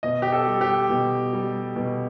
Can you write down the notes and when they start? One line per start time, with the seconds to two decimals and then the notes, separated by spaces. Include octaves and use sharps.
0.03 B2 D#5
0.22 G4
0.32 A4
0.47 G3
0.61 G4
0.90 B2
1.33 G3
1.76 B2